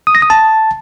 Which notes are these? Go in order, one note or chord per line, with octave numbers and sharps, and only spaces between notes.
D#6
A#6
D#6
A5